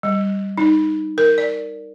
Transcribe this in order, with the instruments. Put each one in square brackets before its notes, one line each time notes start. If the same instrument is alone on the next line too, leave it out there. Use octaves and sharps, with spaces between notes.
[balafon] G3
D#4
A#4
D5